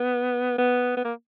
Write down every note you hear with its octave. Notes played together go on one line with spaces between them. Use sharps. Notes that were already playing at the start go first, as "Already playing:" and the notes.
Already playing: B3
B3
B3
A#3